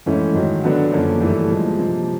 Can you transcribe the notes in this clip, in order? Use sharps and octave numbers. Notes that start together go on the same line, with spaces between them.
G#2 E3 A3 C#4
G#2 D#3 F#3
D3 F#3 B3 D4
F#2 D3 F3 A#3 C#4
G2 E3 A3
A#2 F3 G#3
C3 F3 A#3